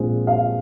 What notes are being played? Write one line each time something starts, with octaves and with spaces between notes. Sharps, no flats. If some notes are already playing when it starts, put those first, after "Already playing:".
Already playing: A#1 A#2 G#3 C4
F5